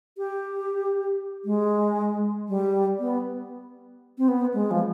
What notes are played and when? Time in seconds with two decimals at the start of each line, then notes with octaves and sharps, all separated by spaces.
0.18 G4
1.45 G#3
2.49 G3
3.00 B3
4.18 C4
4.28 B3
4.54 G#3
4.71 F3